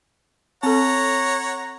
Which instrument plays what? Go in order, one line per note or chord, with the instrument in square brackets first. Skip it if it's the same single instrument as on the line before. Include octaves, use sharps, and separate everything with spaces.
[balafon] C4 A4 [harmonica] C#5 F#5 A#5